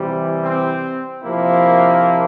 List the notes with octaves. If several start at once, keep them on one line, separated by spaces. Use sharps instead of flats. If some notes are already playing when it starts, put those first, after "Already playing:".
Already playing: C3 E3 G3
C4
C3 F3 A#3 E4